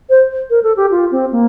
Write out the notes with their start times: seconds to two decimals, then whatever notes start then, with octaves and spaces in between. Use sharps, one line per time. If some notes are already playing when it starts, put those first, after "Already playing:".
0.10 C5
0.50 A#4
0.63 A4
0.77 G4
0.91 F4
1.11 C4
1.32 A#3